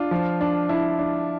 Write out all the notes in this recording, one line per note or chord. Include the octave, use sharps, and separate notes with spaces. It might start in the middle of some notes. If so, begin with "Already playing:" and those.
Already playing: D4 F4
F3
D4
D4 E4
D4